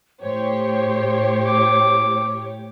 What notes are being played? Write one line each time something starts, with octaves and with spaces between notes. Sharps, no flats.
A2 G4 C5 C#5
D6